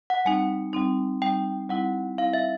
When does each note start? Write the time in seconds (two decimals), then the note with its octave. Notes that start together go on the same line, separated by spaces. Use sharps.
0.10 F#5
0.25 G3 C4 D#4 G#5
0.73 G3 C4 D#4
1.22 G3 C4 D#4 G5
1.70 G3 C4 E4 F#5
2.18 G3 C4 E4 F5
2.33 E5